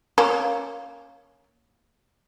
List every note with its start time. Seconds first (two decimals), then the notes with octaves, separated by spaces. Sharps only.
0.18 A#3 C#4